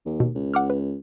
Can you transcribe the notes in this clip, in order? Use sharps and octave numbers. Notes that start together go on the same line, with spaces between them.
D#2
B2
C#2
F#5 D6 F6
B4